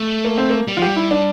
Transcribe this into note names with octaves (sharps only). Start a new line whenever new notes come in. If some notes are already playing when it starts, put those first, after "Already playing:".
Already playing: A3
A#3
C4
A#3
G3
F3 F4
G3 G4
E4
D4